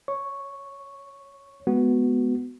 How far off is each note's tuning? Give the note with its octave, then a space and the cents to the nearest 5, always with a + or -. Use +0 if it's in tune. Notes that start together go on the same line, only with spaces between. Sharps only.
C#5 +0 C#6 +0
G#3 +25 B3 +0 F#4 +0